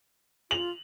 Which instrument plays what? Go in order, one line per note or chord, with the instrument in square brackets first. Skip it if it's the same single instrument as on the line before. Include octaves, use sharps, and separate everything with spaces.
[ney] F4 [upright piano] F7 F#7